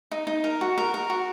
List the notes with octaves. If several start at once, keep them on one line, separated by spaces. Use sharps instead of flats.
D#4
D#4
A#4
F#4
A#4
A#4
F#4